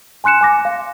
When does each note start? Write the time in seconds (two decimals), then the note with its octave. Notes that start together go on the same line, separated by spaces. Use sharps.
0.24 G#5 C6 F#6 C#7 E7
0.41 G#5 D6 A#6
0.65 F5